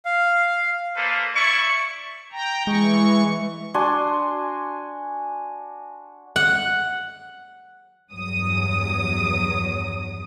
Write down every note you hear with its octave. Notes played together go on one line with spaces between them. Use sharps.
F5
A#3 A4 B4 C5
E4 D5 C#6
G5 A#5
E3 G#3 C#6
D4 F#4 G#5 C6
F#5
E2 G2 F#3 D#6